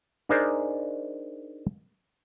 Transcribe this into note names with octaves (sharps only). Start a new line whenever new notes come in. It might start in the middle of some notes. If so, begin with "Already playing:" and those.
D4 D#4 G#4 A#4 C5 D5